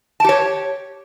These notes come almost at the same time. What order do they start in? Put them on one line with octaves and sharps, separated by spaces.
A5 G4 C#5